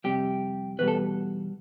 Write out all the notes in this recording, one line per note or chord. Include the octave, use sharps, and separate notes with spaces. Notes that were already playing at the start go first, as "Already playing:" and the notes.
F2 C3 G3 G4
E2 B2 G3 B4
A4